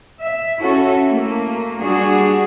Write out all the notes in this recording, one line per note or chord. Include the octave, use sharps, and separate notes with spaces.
E5
C#4 E4 F#4 A4
A3 A#3
G3 D4 F#4 G#4